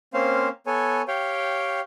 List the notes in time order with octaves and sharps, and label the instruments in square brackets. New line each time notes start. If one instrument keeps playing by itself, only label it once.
[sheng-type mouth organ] A#3 C4 C#4 C5 F5
B3 A4 C#5 G#5
G4 C#5 F5 G5